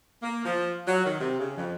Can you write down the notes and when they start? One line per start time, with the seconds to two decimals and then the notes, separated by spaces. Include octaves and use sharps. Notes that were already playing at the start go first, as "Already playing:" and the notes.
0.22 A#3
0.45 F3
0.87 F#3
1.05 D#3
1.19 C3
1.39 C#3
1.57 F2